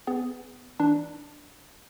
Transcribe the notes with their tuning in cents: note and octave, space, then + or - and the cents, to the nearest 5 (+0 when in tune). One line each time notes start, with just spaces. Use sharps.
B3 +20 G#4 +0
E3 -30 D4 +0